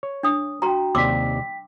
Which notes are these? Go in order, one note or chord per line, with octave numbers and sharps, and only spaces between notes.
C#5
D4 D#6
F#4 G5 A#5 C6
D#2 C3 D5 G5 C6 D6 E6 B6